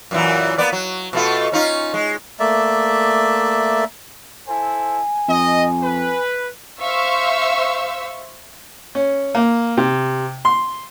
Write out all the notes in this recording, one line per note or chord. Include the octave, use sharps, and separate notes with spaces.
F#2 A#2 E3
A#3 B3 D5
F#3
B2 A3 F4
C#4 D#4 F4
G#3
A3 A#3 D5 E5
E4 A4 C5 G#5
F2 D#5
B4
C5 E5 F5 C#6 E6
C#4
A#3
C3
C6